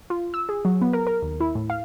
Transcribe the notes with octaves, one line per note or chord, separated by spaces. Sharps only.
F4
E6
G#4
F#3
B3
A#4
A#4
D#2
E4
A2
F5